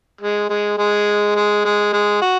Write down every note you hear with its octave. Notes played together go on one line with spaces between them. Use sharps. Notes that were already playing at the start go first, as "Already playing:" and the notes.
G#3
G#3
G#3
G#3
G#3
G#3
F#4